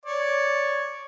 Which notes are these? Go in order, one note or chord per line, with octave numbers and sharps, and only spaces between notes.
C#5 D5